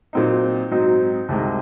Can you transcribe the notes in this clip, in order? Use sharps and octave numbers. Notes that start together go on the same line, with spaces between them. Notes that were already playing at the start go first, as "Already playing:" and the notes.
A#2 F#3 C4 D#4
G#2 F#3 C4 D#4
C2 C3 D#3 G#3